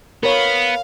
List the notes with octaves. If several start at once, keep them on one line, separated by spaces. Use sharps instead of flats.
B3 A#4 C#5 F5